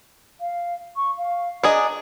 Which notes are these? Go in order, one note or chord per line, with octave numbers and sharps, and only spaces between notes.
F5
C#6
F5
D4 G#4 D#5 A#5